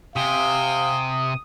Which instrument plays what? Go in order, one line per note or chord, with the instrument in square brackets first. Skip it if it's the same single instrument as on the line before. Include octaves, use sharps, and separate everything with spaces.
[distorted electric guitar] C3 [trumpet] F5 [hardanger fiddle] G5 G#5 [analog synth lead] D#6